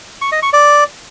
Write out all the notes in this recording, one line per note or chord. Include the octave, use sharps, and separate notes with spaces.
C#6
D#5
C#6
D5